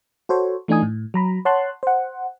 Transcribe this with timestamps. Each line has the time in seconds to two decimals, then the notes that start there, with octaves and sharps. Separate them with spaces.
0.29 F#4 A4 C5 C#5
0.68 E3 A3 D4 D#4 G#5 D#6
0.82 A2
1.14 F#3 A#5 B5
1.45 C#5 F#5 A5 C6 F#6
1.83 C5 F#5